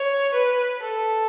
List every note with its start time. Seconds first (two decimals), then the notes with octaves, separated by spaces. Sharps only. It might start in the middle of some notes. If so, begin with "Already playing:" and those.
Already playing: C#5
0.34 B4
0.82 A4